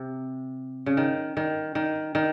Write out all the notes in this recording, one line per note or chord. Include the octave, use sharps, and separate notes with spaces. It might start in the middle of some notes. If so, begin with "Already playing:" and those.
Already playing: C3
C#3
D#3
D#3
D#3
D#3